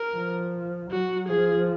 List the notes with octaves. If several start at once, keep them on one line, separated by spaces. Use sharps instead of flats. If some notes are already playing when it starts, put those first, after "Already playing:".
Already playing: A#4
F3
F#3 F#4
F3 G#4